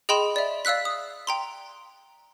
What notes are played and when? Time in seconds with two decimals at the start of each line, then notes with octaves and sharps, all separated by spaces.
0.09 G#4 D#5 G5 B5 C6 E7
0.36 D5 E5
0.65 D5 F5 E6 F#6 B6
0.85 D#6
1.27 G5 A#5 C6